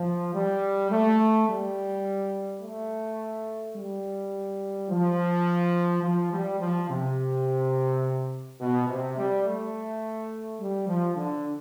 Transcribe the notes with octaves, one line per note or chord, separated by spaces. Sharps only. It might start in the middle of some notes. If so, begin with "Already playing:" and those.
Already playing: F3
G3
A3
G3
A3
G3
F3
F3
G3
F3
C3
B2
C3
G3
A3
G3
F3
D3